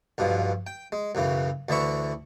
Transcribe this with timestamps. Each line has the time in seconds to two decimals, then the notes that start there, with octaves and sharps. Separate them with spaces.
0.18 B1 G2 B2 F3
0.67 G5
0.92 G#3
1.15 B1 F#2 C#3 E3
1.69 D2 D3 E3 E4 E5 C#6